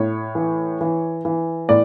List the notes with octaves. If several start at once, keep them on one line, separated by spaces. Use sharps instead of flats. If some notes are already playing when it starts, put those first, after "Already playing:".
Already playing: A2 C#5
E3
E3
E3
A2 D5